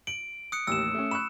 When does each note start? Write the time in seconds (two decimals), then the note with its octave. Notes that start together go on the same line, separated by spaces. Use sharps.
0.07 D7 F#7
0.52 D#6 F#6 C#7
0.67 A1 D#2 E6 E7
0.95 A3 C#4
1.11 B5 C#6 F#6 E7